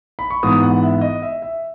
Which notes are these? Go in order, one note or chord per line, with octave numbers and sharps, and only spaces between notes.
B5
C#6
G#2 E3 B3 D#6
F#5
E5
D#5
E5
E5